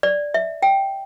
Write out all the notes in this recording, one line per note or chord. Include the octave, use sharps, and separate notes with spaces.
D5
E5
G5